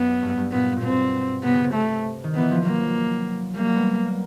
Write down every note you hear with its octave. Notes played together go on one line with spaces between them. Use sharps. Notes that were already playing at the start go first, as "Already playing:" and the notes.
Already playing: F#2 B3
G2
G2
A#2 B3
A#2
B2 C4
C3 B3
C#3
C3
A3
D#3
E3 B3
F3
F#3 A#3
G3 A#3
F#3
B3
A#3